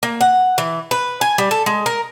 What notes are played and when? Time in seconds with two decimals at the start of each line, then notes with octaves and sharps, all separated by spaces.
0.03 A#3
0.21 F#5
0.58 E3
0.91 B4
1.21 G#5
1.38 G3
1.51 A4
1.66 G#3
1.86 A#4